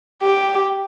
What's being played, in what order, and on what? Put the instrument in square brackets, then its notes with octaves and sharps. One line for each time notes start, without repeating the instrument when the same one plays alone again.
[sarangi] G4